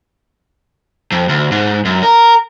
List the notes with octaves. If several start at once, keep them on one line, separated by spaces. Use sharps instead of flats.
F2
D2
G#2
F#2
A#4